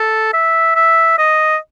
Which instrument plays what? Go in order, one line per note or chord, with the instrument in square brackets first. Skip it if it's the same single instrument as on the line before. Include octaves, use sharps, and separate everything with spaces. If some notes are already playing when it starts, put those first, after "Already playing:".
Already playing: [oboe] A4
E5
E5
D#5